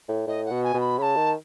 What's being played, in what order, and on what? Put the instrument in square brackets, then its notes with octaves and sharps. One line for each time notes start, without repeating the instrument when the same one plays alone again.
[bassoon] A2
[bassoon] A2 [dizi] D#5
[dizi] F#5
[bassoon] B2
[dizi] G#5
[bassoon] B2
[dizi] B5
[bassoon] C#3 [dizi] A5 B5
[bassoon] D#3